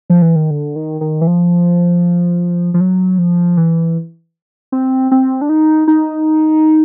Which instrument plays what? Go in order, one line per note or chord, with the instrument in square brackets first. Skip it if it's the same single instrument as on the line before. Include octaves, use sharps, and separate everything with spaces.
[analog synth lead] F3
E3
D#3
D3
D#3
D#3
E3
F3
F3
F#3
F3
E3
C4
C4
D4
D#4
D#4